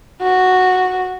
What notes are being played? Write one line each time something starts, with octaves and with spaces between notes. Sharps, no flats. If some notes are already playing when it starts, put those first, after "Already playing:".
F#4